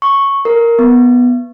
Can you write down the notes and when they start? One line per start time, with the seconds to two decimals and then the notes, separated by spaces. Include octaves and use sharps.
0.02 C#6
0.45 A#4
0.79 B3